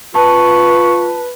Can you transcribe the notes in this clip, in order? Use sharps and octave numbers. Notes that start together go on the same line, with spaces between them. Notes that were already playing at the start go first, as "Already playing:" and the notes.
F4 B4 A5 C#6